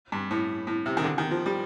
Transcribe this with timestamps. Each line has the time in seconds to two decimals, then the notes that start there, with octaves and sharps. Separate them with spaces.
0.12 G2
0.31 A2
0.67 A2
0.86 C3
0.97 D#3
1.04 D3
1.18 D#3
1.31 F3
1.46 G3